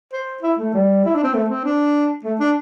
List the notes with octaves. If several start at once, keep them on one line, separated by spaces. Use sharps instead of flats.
C5
E4
A3
G3
E4
D4
C4
A3
C4
D4
A3
D4